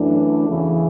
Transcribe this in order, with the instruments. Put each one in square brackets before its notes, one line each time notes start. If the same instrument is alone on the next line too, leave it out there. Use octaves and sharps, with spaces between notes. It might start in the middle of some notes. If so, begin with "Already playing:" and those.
Already playing: [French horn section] F#2 E3 A3 D4
E2 C#3 E3